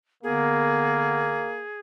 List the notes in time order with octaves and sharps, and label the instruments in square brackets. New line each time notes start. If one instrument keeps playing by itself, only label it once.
[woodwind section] D3 B3 A#4 [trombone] A#3 [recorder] G#4